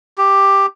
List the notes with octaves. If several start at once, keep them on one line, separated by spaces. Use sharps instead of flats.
G4